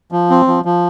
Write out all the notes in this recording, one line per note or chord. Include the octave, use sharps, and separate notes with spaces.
F3
C4
F3
F3